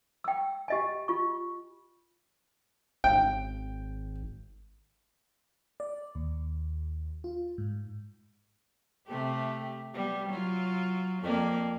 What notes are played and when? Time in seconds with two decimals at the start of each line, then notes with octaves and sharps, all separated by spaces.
0.24 G5 E6
0.68 G4 D#5 G#5
1.08 F4 C#6
3.04 G#1 G5
5.80 D5
6.15 D#2
7.24 F4
7.58 G#2
9.07 C3 A3 G4
9.94 G3 B3
10.30 F#3 F4
11.23 F2 A#3 D5